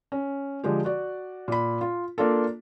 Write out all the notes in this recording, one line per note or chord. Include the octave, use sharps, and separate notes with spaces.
C#4
D3 F3 G#3 G4
F#4 D5
A#2 B5
F4
A#3 D4 F4 A4